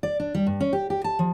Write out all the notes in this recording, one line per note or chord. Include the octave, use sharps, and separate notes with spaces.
D5
D4
G3
G2
C#4
G4
G4
A5
F3